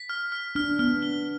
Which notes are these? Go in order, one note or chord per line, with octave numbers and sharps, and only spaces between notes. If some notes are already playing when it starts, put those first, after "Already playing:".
Already playing: B6
F6
F6
D4 F6
B3 F6
G7